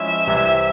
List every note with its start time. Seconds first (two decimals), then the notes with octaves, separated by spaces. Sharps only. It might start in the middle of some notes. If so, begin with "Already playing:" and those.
Already playing: F3 G#3 C#4 E4 E5
0.27 C2 C3 E3